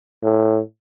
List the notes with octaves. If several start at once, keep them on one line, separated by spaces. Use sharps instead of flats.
A2